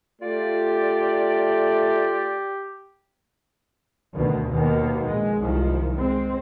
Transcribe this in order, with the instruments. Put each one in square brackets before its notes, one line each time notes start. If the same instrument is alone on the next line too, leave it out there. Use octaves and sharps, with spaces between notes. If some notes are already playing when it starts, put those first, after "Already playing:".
[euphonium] A3 [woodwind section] F4 D5 [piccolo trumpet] G4
[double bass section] D2 B2 D#3
D#2 B2 D#3 A#3
A#1 G#3
C2 D#3 F3
G#3 C4